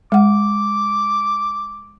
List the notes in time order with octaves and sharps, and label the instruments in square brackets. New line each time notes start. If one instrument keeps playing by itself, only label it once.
[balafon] G#3 F#5 [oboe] D6